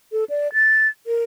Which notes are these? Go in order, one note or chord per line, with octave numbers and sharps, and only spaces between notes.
A4
D5
A6
A#4